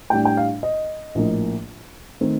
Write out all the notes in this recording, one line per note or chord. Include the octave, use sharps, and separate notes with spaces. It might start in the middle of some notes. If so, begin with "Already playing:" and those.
A2 G3 D4 G5
G5
F5
D#5
A#1 A2 F3 A#3
D#3 A3 C4